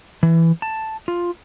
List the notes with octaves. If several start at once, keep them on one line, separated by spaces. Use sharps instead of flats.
E3
A5
F4